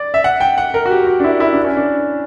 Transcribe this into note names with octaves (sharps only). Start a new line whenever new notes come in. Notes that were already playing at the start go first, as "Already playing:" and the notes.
Already playing: D5
E5
F#5
G5
F#5
A#4
F#4
G4
F#4
D4
E4
E4
D4
C#4
D4